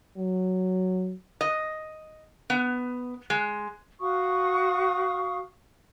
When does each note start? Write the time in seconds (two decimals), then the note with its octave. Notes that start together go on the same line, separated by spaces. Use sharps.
0.17 F#3
1.41 D#5
2.50 B3
3.30 G#3
4.00 F#4 F5 C#6 D#6